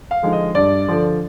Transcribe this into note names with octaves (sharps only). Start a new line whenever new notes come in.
F5
D3 F3 G#3 D#4
D#5
G2 D5
D3 F3